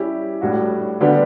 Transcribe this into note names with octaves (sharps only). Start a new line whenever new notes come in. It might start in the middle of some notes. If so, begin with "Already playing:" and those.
Already playing: G3 C#4 E4 G4
A2 G3 D4 F#4
D3 G3 B3 D4 G4